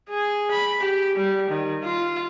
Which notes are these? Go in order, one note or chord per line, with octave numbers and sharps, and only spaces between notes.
G#4
B5
G4
G3
D#3
F4